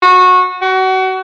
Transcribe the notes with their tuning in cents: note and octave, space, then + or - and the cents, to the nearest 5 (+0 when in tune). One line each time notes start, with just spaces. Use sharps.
F#4 -20
F#4 +30